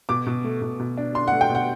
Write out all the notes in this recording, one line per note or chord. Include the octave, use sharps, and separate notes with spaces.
B2 D6
B2
A3
B2
B2
D4
D4 C6
F#5
A3
G5
B2
F#5